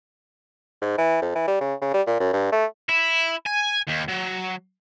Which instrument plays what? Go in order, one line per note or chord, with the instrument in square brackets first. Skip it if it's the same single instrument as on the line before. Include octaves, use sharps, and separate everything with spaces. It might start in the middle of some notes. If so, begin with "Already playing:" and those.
[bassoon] G#2
E3
F2
E3
G3
C#3
C#3
G3
A#2
F#2
G2
A3
[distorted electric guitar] E4
G#5
D#2
F#3